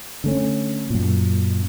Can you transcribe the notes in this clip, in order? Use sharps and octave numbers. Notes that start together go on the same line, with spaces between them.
D3 A3 C#4
F#2 A#2